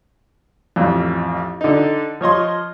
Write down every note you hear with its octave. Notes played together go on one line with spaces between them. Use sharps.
A1 F2
D3 D#4
F3 C#5 D#5 C6